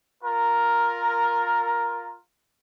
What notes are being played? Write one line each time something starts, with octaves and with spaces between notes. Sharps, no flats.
F4 A#4